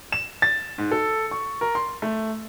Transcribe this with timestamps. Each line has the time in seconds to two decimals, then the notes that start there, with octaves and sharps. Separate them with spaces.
0.12 E7
0.42 A6
0.78 G#2
0.91 A4
1.31 C#6
1.61 A#4
1.75 C6
2.02 A3